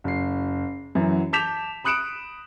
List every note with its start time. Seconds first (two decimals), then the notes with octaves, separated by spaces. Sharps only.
0.04 F#1 C7
0.95 F#2 E3 F#3
1.33 A5 D6 G6 B6 E7 F7
1.84 B5 D#6 F#6 C#7 D7 E7